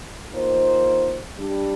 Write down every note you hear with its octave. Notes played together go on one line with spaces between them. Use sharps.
D#3 A#3 F4 C5
G3 D4 G4